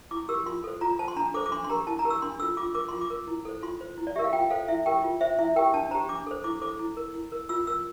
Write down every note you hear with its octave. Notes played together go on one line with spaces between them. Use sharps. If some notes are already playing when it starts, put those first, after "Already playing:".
E4 D6
G4 A#4 E6
F4 C6
A4 C5
F4 A#5
C5 A5
C6
D4 A#5
A4 C5 D6
D6
D4 C6
C6
G4 A#4 A#5
E4 A5
A#5
G4 A#4
E6
D4 C6
F4 A4 E6
F4 D6
A#4 D6
F4 C6
D6
A#4
E4
A4 C5
F4 C6
C5
E4
D5
G4 A#4 E5
F5
F4 G5
A4 C5 F5
E4 E5
G4 A#4 G5
F4
C5 E5
E4 E5
G4 A#4 G5
D4 A5
G4 C5 A#5
D4 D6
A4 C5
E4 D6
A4 C5 D6
E4
A#4
E4
A#4
F4 E6
A#4 E6